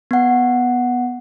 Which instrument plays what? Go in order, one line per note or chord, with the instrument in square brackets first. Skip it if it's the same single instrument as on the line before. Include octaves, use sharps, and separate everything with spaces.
[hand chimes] B3 F#5